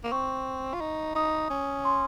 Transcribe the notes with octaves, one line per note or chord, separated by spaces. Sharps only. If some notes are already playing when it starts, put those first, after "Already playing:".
A#3
C4 C#6
F4
D#4
D#4 D#6
C#4
C6